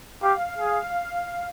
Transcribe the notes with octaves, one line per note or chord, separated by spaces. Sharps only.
G4 F5
G#4